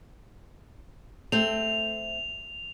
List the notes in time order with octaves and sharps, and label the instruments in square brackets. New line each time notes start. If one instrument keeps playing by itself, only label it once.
[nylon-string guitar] A3 C4 [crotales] F7